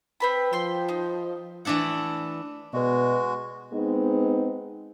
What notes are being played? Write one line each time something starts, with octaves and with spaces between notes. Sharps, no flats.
C4 B4 B5
F3 G5 C6
D#4
E3 A3 D4 E4 F#5
B2 G#3 F#4 B4 D5 D#5
G#3 B3 C4 D#4